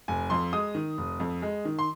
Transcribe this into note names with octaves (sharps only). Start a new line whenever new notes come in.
F1 G#5
F2 C6
G#3 D#6
D#3
F1
F2
G#3
D#3
C6